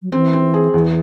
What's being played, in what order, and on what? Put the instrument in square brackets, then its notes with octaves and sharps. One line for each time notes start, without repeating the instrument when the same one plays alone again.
[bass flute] F#3
[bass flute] E3 [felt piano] C4
[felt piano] C4
G#4
[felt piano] E2 [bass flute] E3